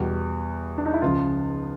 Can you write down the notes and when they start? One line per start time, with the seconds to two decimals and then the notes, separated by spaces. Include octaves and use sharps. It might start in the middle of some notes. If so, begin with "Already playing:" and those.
Already playing: E2 B2 G3 F#4
0.78 D4
0.86 D#4
0.94 E4
1.02 C#2 C#3 F3 F4